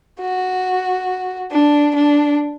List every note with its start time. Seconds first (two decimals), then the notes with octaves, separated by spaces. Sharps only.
0.21 F#4
1.52 D4
1.96 D4